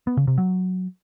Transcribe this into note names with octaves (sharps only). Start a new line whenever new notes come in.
B3
C#3
C3
F#3